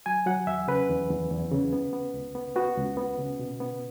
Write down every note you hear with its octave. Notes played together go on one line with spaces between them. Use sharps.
F#3 G#5
F#3 F#5
E2 E5
C#3 B4
E2
E2
E2
C#3
B3
B3
C#2
B3
B3 F#4
C#2
B3
C#3
B2
B3